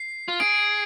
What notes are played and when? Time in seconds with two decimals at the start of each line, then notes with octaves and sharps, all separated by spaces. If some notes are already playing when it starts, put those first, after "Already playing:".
Already playing: C7
0.28 F4
0.40 G#4 D7